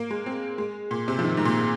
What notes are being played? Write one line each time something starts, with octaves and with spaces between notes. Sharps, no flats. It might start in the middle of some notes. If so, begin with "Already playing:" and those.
Already playing: A#3
G#3
C4
G#3
A#2
C3
F3
D#3
G#2
A#2